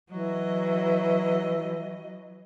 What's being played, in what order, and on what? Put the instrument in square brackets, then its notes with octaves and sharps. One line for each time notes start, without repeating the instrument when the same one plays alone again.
[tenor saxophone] E3 [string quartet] F#3 D#5